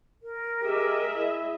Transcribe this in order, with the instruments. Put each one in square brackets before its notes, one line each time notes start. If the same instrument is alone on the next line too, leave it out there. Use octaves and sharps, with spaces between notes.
[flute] A#4
[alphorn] G4 [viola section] G#4 D#5 E5
[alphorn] E4